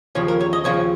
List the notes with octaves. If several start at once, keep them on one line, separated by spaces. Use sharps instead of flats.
D#2 C#3 F3 C#5
A#4
C#5
D#5
D#2 C#3 F3 C#5